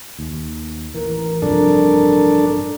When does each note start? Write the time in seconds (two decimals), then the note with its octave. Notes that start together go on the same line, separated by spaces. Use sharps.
0.19 D#2
0.95 A1 E3 A#4
1.42 G2 C3 F3 D4 A4